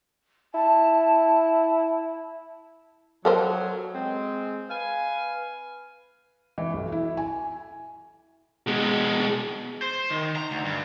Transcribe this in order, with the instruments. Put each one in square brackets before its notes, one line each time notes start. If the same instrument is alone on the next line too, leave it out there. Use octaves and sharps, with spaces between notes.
[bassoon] E4 [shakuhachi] A5
[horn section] F#3 [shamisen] A4 A#4 C5
[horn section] G#3 C4
B4 F5 G#5
[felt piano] E3
B1
E4
G#5
[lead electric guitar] B2 G#3
[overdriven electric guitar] C5
D#3
A#5
D2
G2